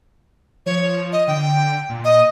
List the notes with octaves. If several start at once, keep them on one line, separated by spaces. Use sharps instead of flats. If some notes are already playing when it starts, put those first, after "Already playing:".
F3 C#5
D#5
D3 G5
A#2
D#5